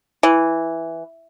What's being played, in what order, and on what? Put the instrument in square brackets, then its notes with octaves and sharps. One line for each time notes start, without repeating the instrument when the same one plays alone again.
[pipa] E3